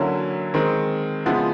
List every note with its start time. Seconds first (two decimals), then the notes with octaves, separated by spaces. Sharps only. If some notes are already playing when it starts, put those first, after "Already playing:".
Already playing: D3 F#3 A#3 C#4 E4
0.54 D#3 G#3 C4
1.26 C#3 F3 G#3 B3 E4